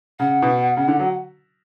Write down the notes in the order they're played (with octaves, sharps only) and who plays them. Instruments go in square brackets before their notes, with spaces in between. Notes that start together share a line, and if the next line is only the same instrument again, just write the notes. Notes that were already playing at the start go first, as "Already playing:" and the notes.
[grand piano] C#3 [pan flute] F#5
[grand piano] B2
C#3
D3
F#3